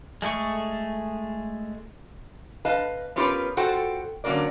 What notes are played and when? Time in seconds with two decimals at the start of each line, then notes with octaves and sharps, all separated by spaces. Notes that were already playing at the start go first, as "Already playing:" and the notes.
0.22 G#3 A3 G#4 C#6
2.65 B4 D#5 F5 A5
3.16 B3 C#4 F4 G4 A#4 B4
3.57 F4 F#4 A4 C5 F#5 G5
4.24 D3 F#3 A#3 C#4 A#4 D5